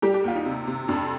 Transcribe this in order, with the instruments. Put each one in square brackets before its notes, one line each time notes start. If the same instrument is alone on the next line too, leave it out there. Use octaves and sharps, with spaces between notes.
[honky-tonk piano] G3 [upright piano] G4
[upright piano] G4
[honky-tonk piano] D#2 [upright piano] F4
[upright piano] D#4
[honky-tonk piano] C3
C3
[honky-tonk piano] F2 [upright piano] D4